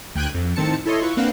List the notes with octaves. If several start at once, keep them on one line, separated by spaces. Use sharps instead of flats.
D2 G5 F#6 G#6 D#7
F2
A2 D#3 C4 A5 C#7
E4 A4 C#5 D#5 C6
E4 F4 B4 C#6
A#3 C4 D4 B4 F5 F#5